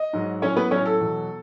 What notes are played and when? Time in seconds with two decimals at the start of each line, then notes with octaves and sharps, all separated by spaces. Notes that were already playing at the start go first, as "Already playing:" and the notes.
Already playing: D#5
0.13 G#2 F#3
0.42 A2 F#3 C#4 C#5
0.57 B3 B4
0.71 A2 F#3 C#4 C#5
0.86 A4
1.00 E2 B2 F#3